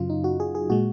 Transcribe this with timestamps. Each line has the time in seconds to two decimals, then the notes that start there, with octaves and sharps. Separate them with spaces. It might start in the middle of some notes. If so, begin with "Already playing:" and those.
Already playing: F#2 C#3 F#3 F4
0.10 D#4
0.24 F#4
0.40 G#4
0.55 G#4
0.70 A#2 G#3 F#4